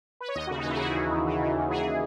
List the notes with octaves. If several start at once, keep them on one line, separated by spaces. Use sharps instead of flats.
B4
C#5
D#2 D#5
C#3 F#4
D#4
E3 E4
G#4
C#3 F#4
D#2
D#2
E3
C#3
D#2
E3 G#4